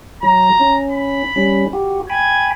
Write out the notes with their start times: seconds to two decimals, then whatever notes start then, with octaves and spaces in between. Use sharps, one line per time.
0.23 F#3 A#5
0.60 C#4
0.91 B5
1.36 G3 C#4
1.73 F#4 G4
2.10 G5 G#5 B5 G#6